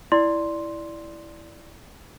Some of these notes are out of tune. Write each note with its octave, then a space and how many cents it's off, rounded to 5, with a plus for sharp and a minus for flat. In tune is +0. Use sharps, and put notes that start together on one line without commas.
E4 +0 D5 +0 C6 +0